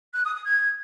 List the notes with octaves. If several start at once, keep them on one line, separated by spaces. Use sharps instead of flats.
F#6
D#6
D#6
G#6